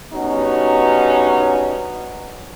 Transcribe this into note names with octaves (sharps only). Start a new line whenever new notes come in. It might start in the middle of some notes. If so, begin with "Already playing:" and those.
G2 B3 C#4 D#4 F#4